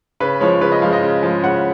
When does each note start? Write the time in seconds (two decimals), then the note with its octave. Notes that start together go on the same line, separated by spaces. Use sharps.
0.20 C#3 B4
0.40 F3 G#3 C#5
0.61 C#3 B4
0.72 D#5
0.82 F3 G#3 F5
0.93 D#5
1.03 C#3
1.23 F3 G#3
1.43 C#3 F#5